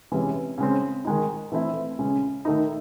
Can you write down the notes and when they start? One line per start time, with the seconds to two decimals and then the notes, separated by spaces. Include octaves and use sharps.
0.12 C3 E3 G#3 C#4
0.58 C#3 G#3 C4
1.05 D#3 G#3 D#4
1.52 E3 A3 C4 E4
1.99 C#3 G#3 C#4
2.45 D#3 A3 D#4